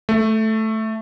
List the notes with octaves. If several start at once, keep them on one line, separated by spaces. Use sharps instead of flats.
A3